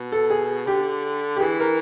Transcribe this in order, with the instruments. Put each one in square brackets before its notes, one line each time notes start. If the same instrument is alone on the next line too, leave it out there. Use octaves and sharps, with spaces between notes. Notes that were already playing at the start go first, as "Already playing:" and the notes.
Already playing: [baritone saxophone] B2
[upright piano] A4
G#4
[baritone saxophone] D3 [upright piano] G4
[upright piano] G4
[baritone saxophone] E3 [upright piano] G#4
[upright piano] A#4